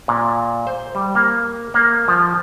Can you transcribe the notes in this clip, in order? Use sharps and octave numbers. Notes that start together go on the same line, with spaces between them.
A#2
C5
G3
A#3
A#3
F3